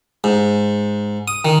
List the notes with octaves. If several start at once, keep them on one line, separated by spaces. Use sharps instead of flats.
G#2
D#6
D#3